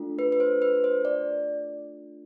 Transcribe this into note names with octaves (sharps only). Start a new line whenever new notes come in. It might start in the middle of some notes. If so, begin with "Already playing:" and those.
Already playing: A3 D4 F4 A4
B4
B4
C5
B4
C5
D5